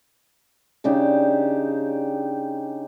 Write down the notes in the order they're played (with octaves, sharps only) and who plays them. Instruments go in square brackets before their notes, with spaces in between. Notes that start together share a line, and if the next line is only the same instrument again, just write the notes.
[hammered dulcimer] C#3 D4 D#4 G4